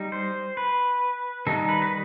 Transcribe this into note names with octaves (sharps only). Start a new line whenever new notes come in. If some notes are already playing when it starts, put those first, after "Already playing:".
Already playing: G3 D#4
C5
B4
D#3 G3 D#4 A4
B4
B4